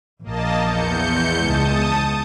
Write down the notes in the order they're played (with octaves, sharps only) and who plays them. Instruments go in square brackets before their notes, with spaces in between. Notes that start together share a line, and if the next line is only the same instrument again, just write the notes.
[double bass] A#1 [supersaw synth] A#3 D#5 A5
[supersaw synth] E2 G6 C#7
[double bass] C#2 G#3 [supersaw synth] A5 D#6